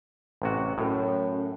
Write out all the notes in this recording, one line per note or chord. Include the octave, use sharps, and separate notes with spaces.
A1 C3 F#4
F#2 A2